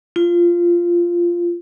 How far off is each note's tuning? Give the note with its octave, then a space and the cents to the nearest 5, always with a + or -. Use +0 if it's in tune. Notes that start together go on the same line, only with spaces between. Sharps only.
F4 -10